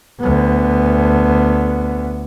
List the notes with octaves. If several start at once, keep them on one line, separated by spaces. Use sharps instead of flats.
D2 B3